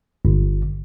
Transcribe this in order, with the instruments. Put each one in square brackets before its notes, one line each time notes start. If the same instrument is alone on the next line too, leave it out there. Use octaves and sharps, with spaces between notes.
[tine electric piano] G1